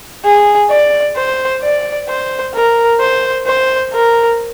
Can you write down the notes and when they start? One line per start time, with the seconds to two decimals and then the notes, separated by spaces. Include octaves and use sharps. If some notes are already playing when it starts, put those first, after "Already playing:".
0.25 G#4
0.71 D5
1.16 C5
1.62 D5
2.09 C5
2.54 A#4
3.01 C5
3.47 C5
3.93 A#4